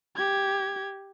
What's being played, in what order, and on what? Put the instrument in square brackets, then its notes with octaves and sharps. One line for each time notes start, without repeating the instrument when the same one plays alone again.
[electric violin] G4 G#6